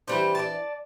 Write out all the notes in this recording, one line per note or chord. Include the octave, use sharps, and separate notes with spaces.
E3 G3 C4 D4 B4 C5
D5 A5